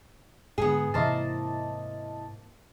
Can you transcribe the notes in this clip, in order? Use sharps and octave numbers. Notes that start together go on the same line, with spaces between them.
G#2 D3 B3 G#4
G#2 C3 E3 A#3 E4 C5 D#5 A5